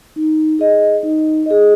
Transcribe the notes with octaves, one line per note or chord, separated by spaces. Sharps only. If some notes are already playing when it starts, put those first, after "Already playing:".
D#4
G#4 D#5
D#4
G#4 D#5